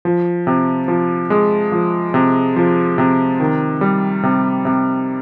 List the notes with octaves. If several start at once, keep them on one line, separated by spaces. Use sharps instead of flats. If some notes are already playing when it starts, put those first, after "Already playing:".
F3
C3
F3
G#3
F3
C3
F3
C3
D#3
G3
C3
C3